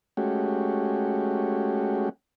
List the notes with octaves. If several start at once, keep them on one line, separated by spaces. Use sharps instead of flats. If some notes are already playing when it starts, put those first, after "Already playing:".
G#3 A3 C#4 F#4 G4